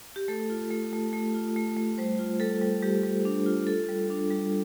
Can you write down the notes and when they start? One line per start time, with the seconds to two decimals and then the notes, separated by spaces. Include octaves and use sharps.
0.16 G4
0.28 A3 A4
0.50 F4
0.71 A3
0.93 A3
1.13 A3
1.34 F4
1.56 A3
1.76 A3
1.98 G3 C5
2.19 F4
2.40 G3 A4
2.61 G3
2.82 G3 G4
3.04 G3
3.25 D4
3.46 F4
3.67 F4 A4
3.89 G3
4.10 D4
4.31 G3